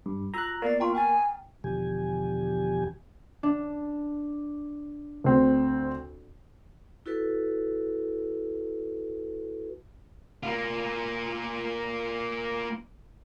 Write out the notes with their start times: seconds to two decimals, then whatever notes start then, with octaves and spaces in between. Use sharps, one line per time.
0.06 G2
0.34 F4 F#4 A#5 E6 F#6
0.62 A#3 B3 B4 D5 C7
0.80 F4 G5 A#5 C#6
0.95 G5 G#5 F6 A6
1.64 E2 B2 D3 F3 G4 G#5
3.43 D4
5.24 D2 C4
7.06 E4 F#4 A4 B4
10.43 A#3 F4